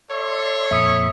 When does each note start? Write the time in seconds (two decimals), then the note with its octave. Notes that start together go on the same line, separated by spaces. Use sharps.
0.11 A4 C#5 D5 E5 C6
0.71 F2 A#2 E5 B5 D#6 C#7